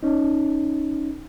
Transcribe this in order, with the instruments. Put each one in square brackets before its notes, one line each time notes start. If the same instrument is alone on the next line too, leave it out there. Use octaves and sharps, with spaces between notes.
[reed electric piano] C#4 D#4